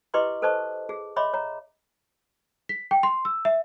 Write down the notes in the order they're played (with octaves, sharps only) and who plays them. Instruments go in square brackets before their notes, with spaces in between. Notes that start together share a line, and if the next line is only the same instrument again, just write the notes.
[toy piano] E4 G4 B4 D#5 C6 D6
A4 B4 C5 D#5 A5 C#6
G#4
C#5 D#5 E5 B5 C6 D6
C#5 A#5
[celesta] B6
G5
C6
E6
E5